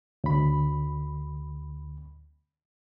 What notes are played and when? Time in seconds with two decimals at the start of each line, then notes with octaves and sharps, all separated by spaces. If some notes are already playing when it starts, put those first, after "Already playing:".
0.24 D2 B5